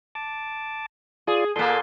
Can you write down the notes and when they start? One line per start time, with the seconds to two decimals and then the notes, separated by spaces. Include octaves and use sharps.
0.15 A5 D6
1.27 F4 G#4 D5
1.56 A#2 A#3 A4 G#5 C6